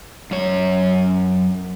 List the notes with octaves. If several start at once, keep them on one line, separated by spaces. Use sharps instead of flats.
F#2 C#5